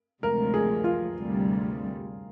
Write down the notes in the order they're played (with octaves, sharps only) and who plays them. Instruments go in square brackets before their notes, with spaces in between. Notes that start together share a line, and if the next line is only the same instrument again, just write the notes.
[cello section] D2 C3 F3 G#3 [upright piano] A#4
[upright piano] G#4
F4
[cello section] D2 C3 G3